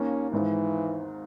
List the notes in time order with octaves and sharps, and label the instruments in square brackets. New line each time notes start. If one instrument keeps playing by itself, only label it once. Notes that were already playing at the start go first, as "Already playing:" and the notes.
Already playing: [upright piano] D#2 D#3 A#3 [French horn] C#4
[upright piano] G#1 G#2 D#3 [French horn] E3